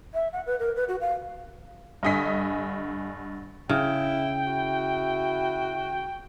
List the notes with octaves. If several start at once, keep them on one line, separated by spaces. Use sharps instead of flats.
E5
F#5
B4
A#4
B4
F#4
F5
G2 D3 D#5 G#5 B6
C#3 E4 G5
E4 F#4